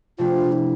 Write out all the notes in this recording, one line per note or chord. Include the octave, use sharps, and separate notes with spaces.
C3 F3 A3 D4 F4
E4